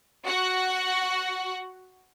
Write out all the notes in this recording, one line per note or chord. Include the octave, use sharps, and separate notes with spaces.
F#4 F#5